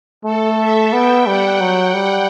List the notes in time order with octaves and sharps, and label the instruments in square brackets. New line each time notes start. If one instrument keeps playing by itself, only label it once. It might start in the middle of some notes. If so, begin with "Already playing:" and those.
[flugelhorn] A3 [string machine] A4
[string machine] E5
[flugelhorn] B3 [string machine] G5
[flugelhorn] G3 [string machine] F#5
[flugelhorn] F#3
G3